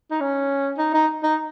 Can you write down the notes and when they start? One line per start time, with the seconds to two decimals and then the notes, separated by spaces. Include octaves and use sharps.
0.11 D#4
0.21 C#4
0.78 D#4
0.94 D#4
1.23 D#4